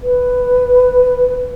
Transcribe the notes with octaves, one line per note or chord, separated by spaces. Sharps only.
B4